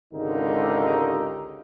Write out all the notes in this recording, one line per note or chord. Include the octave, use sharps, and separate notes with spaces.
G#1 C#2 D3 D#4 G4 A#4